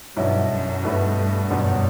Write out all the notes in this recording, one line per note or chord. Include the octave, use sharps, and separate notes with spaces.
B1 G2 B2 F#3 C#4 E4
F#2
B1 G2 B2 A3 E4 B4
F#1 E2 G2 B2 F#3 C#4